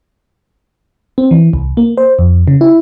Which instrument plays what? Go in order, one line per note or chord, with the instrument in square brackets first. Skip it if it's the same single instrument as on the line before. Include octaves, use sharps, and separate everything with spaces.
[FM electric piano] C4
E3
C2
A#3
C5
F2
C#3
E4